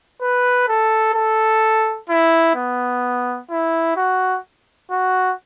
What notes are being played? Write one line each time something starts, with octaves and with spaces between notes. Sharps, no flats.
B4
A4
A4
E4
B3
E4
F#4
F#4